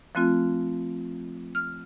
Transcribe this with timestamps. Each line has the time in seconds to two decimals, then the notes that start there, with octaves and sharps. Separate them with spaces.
0.15 F3 A3 C4 F4 F#6
1.55 F6